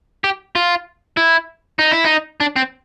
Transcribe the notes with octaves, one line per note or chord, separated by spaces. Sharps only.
G4
F4
E4
D#4
E4
D#4
D4
C4